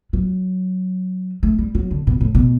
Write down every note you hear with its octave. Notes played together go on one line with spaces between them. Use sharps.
F#3
A3
G3
F#3
D3
B2
A2
B2